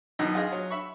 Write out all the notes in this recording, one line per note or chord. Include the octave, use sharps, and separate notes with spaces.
F#2 B2 D#3 D#4 D#5
F4 G#4 D#5
F#3
E5 B5 C#6